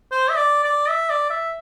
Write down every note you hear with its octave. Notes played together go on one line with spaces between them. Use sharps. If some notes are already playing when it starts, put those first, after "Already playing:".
C5
E5
D5
D5
E5
D5
E5